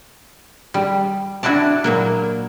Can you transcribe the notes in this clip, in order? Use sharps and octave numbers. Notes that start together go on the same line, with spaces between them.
G3
D4 E4 F#4 D5 A5
A#2 F#3 A#3